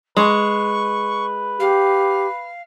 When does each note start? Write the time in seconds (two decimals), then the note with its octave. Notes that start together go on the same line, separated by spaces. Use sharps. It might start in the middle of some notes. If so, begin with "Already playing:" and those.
0.17 G#3 B4 C#6
1.59 G4 F5